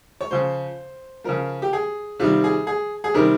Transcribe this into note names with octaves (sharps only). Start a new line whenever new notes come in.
C#5
C#3 F3 C5
C#3 F3 A#4
G4
G#4
C3 D#3 G3 F4
G#4
G#4
G#4
C3 D#3 G3 A#4